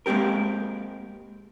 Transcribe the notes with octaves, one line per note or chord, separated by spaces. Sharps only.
G#3 A#3 C4 G4 A#4